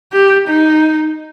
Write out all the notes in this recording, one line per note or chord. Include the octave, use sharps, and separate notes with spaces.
G4
D#4